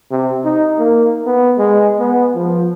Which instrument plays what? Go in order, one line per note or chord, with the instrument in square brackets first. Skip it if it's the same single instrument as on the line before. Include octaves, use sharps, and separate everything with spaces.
[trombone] C3
D#4
A#3
B3
G#3
B3
F3